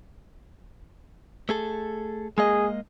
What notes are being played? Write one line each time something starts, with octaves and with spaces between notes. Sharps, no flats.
A3 G#4 A4
G#3 A#3 G#4 D#5